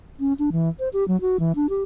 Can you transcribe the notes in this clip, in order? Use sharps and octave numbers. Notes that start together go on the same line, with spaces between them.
C#4
D4
E3
C5
G4
F#3
F#4
E3
D4
G4